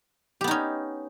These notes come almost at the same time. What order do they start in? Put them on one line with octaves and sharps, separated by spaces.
G4 B3 D#4 C#4